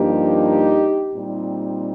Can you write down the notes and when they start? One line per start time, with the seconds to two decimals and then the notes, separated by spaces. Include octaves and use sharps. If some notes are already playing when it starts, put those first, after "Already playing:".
Already playing: G2 F3 A#3 D4 D#4 G4
1.15 A#2 G3 C4 D#4